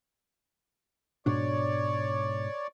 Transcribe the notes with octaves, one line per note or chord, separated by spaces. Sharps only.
G#2 B2 D4 C#5 D5